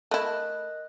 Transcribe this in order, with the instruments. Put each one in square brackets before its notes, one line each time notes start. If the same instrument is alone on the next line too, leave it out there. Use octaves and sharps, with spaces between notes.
[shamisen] A3 E4 [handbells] A#4 D#5 F#6